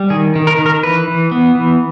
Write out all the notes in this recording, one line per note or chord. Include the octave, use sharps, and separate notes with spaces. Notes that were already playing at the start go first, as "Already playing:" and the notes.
Already playing: G3
D#3 G#4
D#3
A#4
D#3
A#4
E3 B4
E3
B3
E3